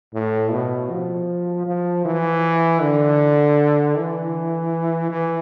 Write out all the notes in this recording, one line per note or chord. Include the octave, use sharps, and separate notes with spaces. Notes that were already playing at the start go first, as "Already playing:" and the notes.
A2
B2
F3
F3
E3
D3
E3
E3